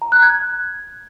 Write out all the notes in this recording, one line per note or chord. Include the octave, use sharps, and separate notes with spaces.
A#5
F#6
G#6